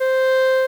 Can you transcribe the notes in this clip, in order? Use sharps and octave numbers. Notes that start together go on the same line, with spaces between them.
C5